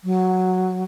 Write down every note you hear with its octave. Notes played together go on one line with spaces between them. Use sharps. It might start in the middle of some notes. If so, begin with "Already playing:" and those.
F#3